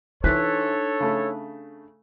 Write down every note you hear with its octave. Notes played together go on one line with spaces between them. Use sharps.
E3 D4 D#4 A4 C5 C#5 F#6 B6
C#3 A3